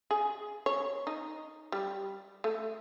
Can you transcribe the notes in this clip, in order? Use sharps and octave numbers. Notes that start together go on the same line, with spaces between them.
G#4
C#5
D#4
G3
A3